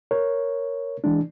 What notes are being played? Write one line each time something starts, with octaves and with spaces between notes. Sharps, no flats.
A#4 C#5
E3 G#3 D4